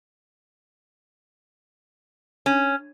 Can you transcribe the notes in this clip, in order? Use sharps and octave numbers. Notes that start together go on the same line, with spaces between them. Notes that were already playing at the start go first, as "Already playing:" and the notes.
C#4